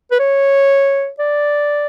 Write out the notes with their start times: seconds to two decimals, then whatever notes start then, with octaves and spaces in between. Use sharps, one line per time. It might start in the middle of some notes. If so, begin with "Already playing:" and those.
0.11 B4
0.19 C#5
1.19 D5